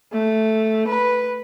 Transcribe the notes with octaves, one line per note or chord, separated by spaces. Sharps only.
A3
B4